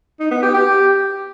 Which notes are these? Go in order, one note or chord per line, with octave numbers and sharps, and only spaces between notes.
D#4
B3
G4
G4